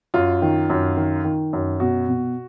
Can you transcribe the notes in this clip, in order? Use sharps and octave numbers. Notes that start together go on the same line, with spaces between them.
F#2 F4
D#3
F#2
D#3
D#3
F#2
B2 F#4
B2